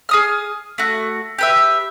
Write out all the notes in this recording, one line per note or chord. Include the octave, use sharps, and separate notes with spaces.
G#4 D#6 F6
A3 F#4
G4 B4 E5